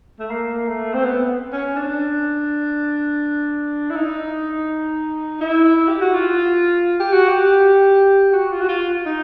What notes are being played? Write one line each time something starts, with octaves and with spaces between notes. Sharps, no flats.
A3
A#3
A3
C4
B3
C#4
D4
E4
D#4
E4
G4
F#4
F4
G4
F#4
G4
F#4
F4
F#4
F4
D#4